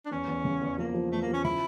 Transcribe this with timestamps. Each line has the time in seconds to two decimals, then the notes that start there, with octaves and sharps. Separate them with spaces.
0.05 D4
0.11 E2 C#4
0.28 E2
0.45 C#3
0.62 E2
0.78 F3 A#3
0.94 F3
1.11 E2 A3
1.22 A#3
1.28 F3
1.33 C#4
1.44 C#3 E4